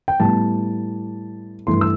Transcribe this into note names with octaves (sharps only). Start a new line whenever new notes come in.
G5
A2 G3 B3 A5
G2 E3 A3 C6
E6